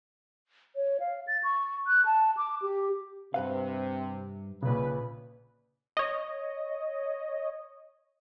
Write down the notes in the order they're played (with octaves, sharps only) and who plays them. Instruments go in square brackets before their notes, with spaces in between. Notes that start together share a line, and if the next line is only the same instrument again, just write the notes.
[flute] C#5
F5
A6
C#6
F#6
A5
D6
G4
[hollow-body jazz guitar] G2 B4 F5 [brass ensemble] C3
[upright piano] A#1 C#3 [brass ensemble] B4
[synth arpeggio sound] C#5 D#5